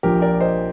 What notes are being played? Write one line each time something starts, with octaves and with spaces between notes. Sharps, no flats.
A#1 A#2 F3 G4 A#4
A#4 D5
C5 D#5